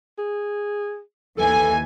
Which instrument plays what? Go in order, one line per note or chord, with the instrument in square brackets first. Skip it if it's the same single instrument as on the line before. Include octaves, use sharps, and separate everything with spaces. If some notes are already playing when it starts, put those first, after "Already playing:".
[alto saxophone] G#4
[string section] D#2 E3 G#5 [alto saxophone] A4